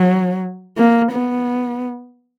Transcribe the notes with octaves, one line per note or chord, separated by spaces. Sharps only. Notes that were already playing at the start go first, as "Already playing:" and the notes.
Already playing: F#3
A#3
B3